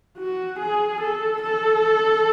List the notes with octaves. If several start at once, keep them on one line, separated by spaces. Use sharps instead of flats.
F#4
G#4
A4
A4